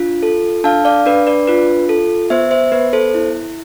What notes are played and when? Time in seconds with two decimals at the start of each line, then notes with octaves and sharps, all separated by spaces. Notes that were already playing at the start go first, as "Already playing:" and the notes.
Already playing: D4 F4
0.23 A4
0.64 D4 F5 A5
0.85 D5 F5
1.06 D4 B4 D5
1.27 B4 D5
1.47 F4 B4
1.89 A4
2.30 B3 C5 E5
2.51 C5 E5
2.72 B3 B4
2.93 A4 C5
3.14 E4